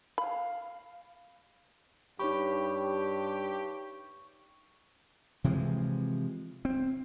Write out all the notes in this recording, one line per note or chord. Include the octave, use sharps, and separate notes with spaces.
F5 B5
G2 D#4 G4 C#5 B5 C#6
C3 E3 F3 G#3
C4